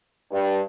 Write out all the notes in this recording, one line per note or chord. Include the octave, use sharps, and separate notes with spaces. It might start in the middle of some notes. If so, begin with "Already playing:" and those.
G2